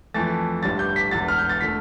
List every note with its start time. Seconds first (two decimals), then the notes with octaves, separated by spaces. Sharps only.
0.14 F2 E3 A3 A6
0.63 A1 G2 D3 G3 A6
0.79 G6
0.96 B6
1.11 E1 E2 D3 A6
1.28 F6
1.39 G6
1.49 A6
1.61 D3 A3 B6